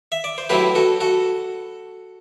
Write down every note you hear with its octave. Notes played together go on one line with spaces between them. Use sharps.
E5
D5
C5
A2 F#3 C4 E4 G4 B4
F#4 A4
F#4 A4